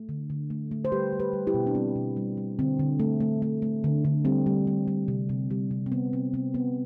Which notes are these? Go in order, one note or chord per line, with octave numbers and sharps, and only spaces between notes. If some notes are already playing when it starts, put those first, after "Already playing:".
Already playing: A3
D3
D3
A3
A3
C5
G3 G4 B4
G3
G4 B4
G3
E4 G4
B2
D4
G3 C4
B2
G3
G3
D3 C4
D3
A3
A3
A3
A3
D3
D3
G3 C4
G3
G3
G3
C3
C3
G3
C3
C4
C3 B3
C3 C4
C3 C4
C3 B3